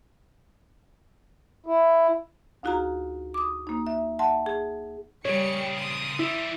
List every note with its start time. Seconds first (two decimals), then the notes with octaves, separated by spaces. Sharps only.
1.66 E4
2.63 D2 D#4 F4 F#4 G#4 A#5
3.34 D6 D#6
3.67 A#3 D#4
3.87 E5
4.19 E5 F#5 A5 C6
4.46 G#4
5.25 A#2 C#3 G3 C#5 G5 C#7
5.76 C6 D#6
6.19 E3 G3 E4